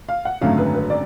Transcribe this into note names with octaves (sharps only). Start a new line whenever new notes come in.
F5
F#5
G#1 F#2 D3 F#3 A3 F5
B4
B4
D5